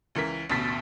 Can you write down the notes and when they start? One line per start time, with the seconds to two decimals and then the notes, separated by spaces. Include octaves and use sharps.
0.15 C#2 E3 A#4 B6
0.50 A1 D2 B2 A6 B6